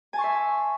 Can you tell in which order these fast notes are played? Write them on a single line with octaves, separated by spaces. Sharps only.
G#5 A5 C#6 C6 E5